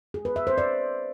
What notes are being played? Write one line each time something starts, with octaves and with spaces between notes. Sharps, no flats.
G#4
B4
E5
C5
D5